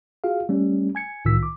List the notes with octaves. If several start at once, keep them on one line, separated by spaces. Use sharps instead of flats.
F4 F#4 G#4 F5
G3 A3 C#4
G#5 G#6 C#7
C2 A2 D#3 F4 E6 B6
D6